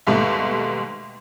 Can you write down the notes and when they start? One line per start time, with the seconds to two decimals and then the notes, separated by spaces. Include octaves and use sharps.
0.07 D#2 G#2 B2 G3 A3